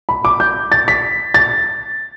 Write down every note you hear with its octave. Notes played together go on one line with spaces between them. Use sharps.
B5
D6
G6
A6
B6
A6